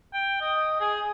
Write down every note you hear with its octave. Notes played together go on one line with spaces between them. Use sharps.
G5
D#5
G#4